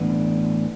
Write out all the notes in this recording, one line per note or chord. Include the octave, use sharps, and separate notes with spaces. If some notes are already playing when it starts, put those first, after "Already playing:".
Already playing: A2 E3 B3 D4